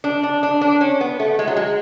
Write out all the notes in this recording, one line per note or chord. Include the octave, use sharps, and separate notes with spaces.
D4
D4
D4
D4
C#4
B3
A3
G#3
F#3
G#3